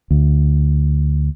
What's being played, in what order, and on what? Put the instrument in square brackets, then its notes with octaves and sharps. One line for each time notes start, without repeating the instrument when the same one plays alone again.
[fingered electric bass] D2